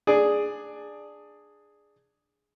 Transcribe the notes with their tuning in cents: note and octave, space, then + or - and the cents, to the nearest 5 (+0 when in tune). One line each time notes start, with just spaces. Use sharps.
D4 +15 G#4 +0 D5 +10